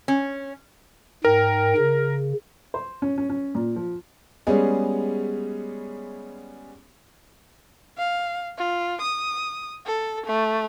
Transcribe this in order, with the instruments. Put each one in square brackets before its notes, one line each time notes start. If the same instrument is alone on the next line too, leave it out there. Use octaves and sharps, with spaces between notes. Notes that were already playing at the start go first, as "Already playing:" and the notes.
[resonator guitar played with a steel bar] C#4
[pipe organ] G#2 G5 [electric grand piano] A#4
[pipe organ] C#3
[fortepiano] C5
C#4
C#4
C#4
A#2
F3
[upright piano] G3 G#3 B3 C#4 G#4
[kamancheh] F5
F4
D#6
A4
A3